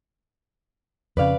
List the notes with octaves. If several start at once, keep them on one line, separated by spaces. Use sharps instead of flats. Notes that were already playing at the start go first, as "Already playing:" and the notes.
F2 C#3 B4 D5 F5